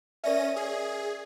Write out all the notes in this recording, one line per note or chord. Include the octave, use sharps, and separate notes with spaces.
C#4 A#4 D5 E5 A#6 D#7
G#4